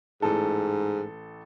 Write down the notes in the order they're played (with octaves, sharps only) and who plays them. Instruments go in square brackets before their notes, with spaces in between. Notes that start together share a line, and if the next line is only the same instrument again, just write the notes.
[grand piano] A1 A4 [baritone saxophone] G#2